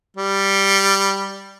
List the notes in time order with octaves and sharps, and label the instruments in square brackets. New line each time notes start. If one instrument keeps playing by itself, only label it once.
[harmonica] G3